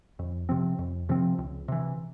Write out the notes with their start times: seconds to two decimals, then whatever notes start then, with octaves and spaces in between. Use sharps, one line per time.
0.19 F2
0.49 C3 F3 C4
0.79 F2
1.09 C3 F3 C4
1.38 C#2
1.68 C3 E3